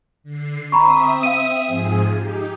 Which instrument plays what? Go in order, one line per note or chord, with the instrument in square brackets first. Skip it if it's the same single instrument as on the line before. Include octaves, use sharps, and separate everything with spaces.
[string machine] D3 C7
[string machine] C4 E5 D#6 [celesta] A#5 B5 C#6
[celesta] F5 D#7
[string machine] G#2 F3 G#4
D#4 G4